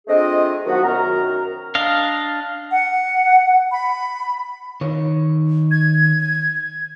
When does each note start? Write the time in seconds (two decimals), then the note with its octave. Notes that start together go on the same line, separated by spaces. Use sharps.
0.08 A3 C4 D4 F4 G#4 D#5
0.66 D#3 F3 F#3 B3 F#4
0.84 F#2 D#3 F#4 A#4 A#5
1.75 D4 D#5 F5
2.71 F#5
3.71 B5
4.81 D#3 C#5
5.71 G#6